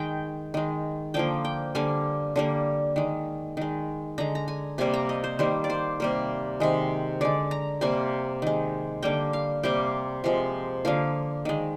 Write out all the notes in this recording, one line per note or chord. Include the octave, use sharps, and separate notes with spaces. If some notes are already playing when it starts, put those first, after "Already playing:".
Already playing: D#3 G#3 G5
D#3 G#3
D3 F3 A#3 G5
G5
D3 G3 A#3 G#5
D3 G3 A#3
D#3 G#3
D#3 G#3
D3 G#3 A#5
A#5
G#5
C3 G3 A#3 G#5
A#5
D#5
C5
D#3 G3 A#3 C5
D5
C5
C3 G3 A#3
C3 D#3 G#3
D3 G#3 D5
A#5
C3 G3 A#3 G#5
D#3 G#3
D3 G3 A#3 G5
F5
C3 G3 A#3 G5
C3 F3 G#3
D3 F3 A#3 F5
D#3 G#3